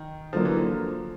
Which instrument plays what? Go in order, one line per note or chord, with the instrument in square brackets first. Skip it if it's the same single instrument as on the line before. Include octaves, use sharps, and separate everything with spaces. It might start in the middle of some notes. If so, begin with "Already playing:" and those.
Already playing: [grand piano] D#3
[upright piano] D3 F#3 A#3 [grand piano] F3
[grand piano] E3
F3